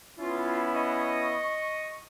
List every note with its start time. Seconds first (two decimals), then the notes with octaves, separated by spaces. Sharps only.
0.19 B3 C#4 E4 F4
0.74 D#5 C#6